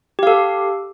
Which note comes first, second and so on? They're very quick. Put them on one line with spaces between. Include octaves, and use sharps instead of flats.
G4 F5 A4